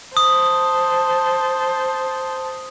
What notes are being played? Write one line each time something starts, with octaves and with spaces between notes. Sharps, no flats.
C5 A5 D#6